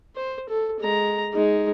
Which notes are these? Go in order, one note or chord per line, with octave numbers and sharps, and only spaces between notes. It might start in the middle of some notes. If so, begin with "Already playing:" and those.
C5
A4
G#3 A#5
G#3 D#4